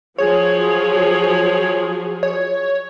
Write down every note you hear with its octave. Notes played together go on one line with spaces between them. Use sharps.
F3 F#3 G#4 C#5
C#5